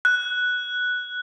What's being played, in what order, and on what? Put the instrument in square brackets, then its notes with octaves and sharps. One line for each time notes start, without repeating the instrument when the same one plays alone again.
[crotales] F#6